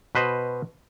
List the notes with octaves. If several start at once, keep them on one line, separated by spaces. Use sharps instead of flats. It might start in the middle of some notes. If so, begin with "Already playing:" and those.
B2 B4 C5 D#5